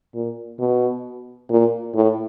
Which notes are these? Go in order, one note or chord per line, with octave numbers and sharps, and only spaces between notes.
A#2
B2
A#2
A2